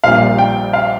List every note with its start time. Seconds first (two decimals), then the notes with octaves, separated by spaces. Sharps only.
0.04 A#1 A#2 G3 F5
0.38 G5
0.73 F5